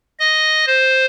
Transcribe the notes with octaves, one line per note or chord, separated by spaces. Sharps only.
D#5
C5